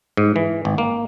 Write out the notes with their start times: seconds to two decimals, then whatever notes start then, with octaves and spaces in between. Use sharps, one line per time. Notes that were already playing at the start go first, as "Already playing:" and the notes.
0.17 G#2
0.36 E3
0.65 G#1
0.78 A#3